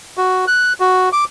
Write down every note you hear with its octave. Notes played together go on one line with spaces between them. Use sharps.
F#4
F#6
F#4
D6